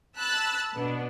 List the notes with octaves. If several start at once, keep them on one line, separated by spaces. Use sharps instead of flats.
A5 B5 E6 F#6 A6
B2 B3 D4